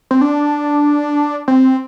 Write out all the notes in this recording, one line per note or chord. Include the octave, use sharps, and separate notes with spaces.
C4
D4
C4